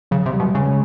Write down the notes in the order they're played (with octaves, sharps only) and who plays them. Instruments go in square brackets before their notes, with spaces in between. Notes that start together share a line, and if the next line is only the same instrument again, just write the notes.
[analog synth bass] C#3 [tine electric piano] F#3
[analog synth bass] C3
[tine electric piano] G3
[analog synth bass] B2
[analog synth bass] C#3 [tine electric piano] G#3